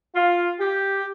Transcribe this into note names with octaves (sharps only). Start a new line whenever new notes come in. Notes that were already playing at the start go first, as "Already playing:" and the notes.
F4
G4